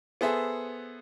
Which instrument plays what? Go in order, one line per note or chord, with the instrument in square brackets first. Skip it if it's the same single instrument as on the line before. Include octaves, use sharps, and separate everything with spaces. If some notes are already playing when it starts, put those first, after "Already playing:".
[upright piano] B3 G#4 A4 C5 E5